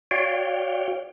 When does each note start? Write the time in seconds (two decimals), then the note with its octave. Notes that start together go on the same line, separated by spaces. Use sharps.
0.11 F#4 C#5 D5 F5 G5